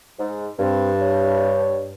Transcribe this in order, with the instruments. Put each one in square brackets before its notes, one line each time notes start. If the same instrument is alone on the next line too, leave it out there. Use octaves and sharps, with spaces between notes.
[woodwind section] G#2
[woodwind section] G2 [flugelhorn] C4
[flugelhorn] C#5